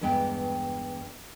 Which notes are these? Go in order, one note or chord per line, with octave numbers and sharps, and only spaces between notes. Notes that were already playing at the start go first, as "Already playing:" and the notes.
E2 G2 G#3 B3 G5